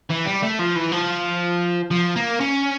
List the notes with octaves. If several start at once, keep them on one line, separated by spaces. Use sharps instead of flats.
E3
G3
A3
F3
E3
F3
F3
A#3
C#4